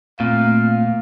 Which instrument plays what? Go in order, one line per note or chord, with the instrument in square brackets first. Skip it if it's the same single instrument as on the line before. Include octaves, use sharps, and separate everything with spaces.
[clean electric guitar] A#2 [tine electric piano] A3 C4 [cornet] F5